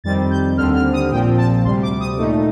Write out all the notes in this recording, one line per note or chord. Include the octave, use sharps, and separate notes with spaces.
F2 D#3 G3 C4 A6
G6
D#2 D3 G3 C4 F6
F6
D#6
A#1 A#2 F3 C4 G5
A5
D2 C3 G3 C6
D6
D#6
A#2 A3 D#4